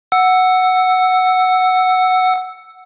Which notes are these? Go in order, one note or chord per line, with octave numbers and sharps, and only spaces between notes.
F#5 E6